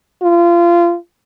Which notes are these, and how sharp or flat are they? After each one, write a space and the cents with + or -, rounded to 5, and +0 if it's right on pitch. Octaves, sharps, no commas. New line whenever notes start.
F4 -25